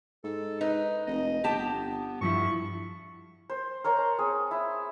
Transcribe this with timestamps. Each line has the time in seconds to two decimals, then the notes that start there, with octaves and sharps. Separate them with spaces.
0.24 G#2 A4
0.61 D#4 B4
1.07 F1 D#5
1.44 G1 G4 G5 A5
1.59 B3
2.21 G2 F3 E4 C#6
3.50 C5
3.84 A#4 C#5 A#5 C6
3.99 A5
4.19 C4 G#4
4.51 E4